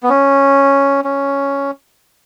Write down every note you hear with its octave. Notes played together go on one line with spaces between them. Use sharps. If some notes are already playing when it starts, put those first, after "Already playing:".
B3
C#4
C#4